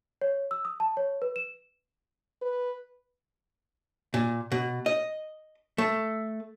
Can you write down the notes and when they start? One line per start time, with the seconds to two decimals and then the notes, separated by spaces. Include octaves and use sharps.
0.21 C#5
0.51 E6
0.65 D#6
0.80 A5
0.97 C#5
1.22 B4
1.36 E7
2.42 B4
4.14 A#2
4.52 B2
4.86 D#5
5.78 A3